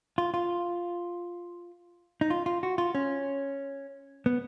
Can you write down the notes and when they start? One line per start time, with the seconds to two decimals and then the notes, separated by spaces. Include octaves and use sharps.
0.18 F4
0.34 F4
2.21 D#4
2.30 F4
2.46 F4
2.63 F#4
2.78 F4
2.95 C#4
4.26 B3